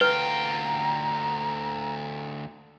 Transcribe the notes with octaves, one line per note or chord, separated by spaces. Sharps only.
D2 F4 B4 G5 A#5